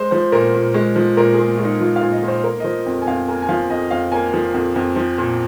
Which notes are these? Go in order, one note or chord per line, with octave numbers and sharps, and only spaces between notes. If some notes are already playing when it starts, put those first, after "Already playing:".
Already playing: G#3 C5
F3 C5
A#2 A#4
A#2
G#3
F3
A#2 A#4
G#4
A#2
G#3 F4
D#4
F3 F4
F5
A#2
D#5
A#2
C5
A#3 A#4
D#5
F3 C5
F2
G#5
F2 F5
A#3 G#5
G#5
F3 F5
F2 D#5
F2 F5
A#3 G#5
F3
F2
F2
F3
A#2